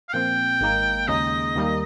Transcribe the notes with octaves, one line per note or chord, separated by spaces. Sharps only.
F5
A#2 F3 C4 G5
G#1 G#2 D#3 A#3 D#4
D#2 C#3 G#3 D#4 D#5
D#2 D#3 G3 A#3 D#4